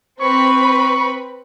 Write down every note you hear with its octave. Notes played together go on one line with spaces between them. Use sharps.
C4 B4 B5 C#6